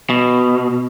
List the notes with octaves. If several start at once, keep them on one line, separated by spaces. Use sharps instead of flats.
B2